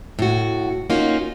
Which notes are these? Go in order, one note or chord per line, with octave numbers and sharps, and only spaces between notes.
A2 F#4
A#3 C#4 D#4 F4 F#4